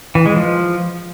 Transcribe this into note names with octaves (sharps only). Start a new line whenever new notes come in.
E3
G#3
F3